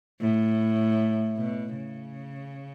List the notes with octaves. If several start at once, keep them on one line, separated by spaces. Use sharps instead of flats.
A2
B2
C#3